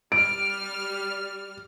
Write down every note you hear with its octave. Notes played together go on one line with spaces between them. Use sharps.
G3 F6 D7